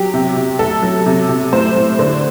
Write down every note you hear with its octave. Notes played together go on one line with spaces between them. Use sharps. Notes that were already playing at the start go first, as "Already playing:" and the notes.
Already playing: F#3 G4
C3
C3
A3 A4
F#3
C3
C3
A2 C5
A2
D3